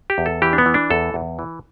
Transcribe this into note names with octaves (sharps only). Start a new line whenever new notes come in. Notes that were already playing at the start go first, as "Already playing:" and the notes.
G4
E2
A4
E3 G4
D4
B3
E3
D4
E2 A4
E2
E3